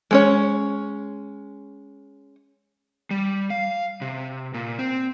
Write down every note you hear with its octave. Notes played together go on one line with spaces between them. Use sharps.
G#3 C#4 C#5
G3
F5
C3
A#2
C4